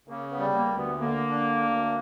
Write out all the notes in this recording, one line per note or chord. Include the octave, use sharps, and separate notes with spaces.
C#3 A#3
B3
G3
A#3
D2
B3
D3 A#3
D4
D2